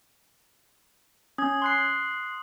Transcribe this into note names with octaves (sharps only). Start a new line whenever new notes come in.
C#4 D#6 G#6
C6 F#6 C7